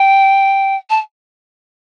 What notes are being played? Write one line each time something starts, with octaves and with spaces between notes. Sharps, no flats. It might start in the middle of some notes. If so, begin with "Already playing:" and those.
Already playing: G5
A5